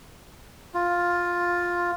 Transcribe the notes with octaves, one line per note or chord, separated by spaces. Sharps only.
F4